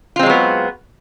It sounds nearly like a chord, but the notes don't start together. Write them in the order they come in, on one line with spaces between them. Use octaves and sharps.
F4 C4 G#3 F#3 B3